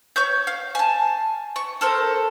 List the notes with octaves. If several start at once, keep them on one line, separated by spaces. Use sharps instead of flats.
C#5 C#6 G6
F5
G#5 A5
C#6
A4 A#4 C5